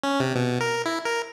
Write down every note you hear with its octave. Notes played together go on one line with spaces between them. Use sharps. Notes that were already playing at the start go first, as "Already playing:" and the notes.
C#4
C3
B2
A#4
E4
A#4